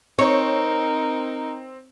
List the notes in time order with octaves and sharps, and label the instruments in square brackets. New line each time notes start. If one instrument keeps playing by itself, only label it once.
[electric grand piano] C4 [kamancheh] D#4 A#4 [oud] C#5